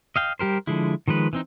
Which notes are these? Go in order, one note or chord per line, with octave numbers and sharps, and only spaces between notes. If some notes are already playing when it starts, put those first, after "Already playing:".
D#5 F5 G5
G3 G4 A#4 C5
D3 F3 G#3 E4
D#3 F3 G#3 B4
E3 C4 D#4